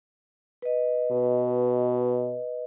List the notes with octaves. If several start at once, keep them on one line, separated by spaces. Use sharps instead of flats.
B4 D#5
B2